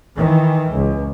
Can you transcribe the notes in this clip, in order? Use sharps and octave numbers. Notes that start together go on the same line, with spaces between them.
D#3 E3
C#2